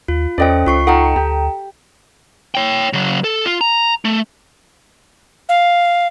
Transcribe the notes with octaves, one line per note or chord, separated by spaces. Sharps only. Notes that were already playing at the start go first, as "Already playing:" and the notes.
D#2 F4
E2 C#4 A4 C5 D5 D#5 G5
C#2 F4 C#6 C7
D#4 F4 A4 F#5 G5 A#5
D2 G4
C#5 G5
C#3 F#3
A4
F4
A#5
A3
F5